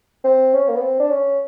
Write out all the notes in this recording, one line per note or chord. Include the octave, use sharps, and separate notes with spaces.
C4
C#4
A#3
B3
C4
D4
C#4